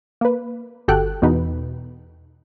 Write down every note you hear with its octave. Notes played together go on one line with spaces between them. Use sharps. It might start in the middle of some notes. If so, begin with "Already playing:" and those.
A#3 B4
G1 F#4 G4 A4 G5 F#6
E2 B2 D#4 B4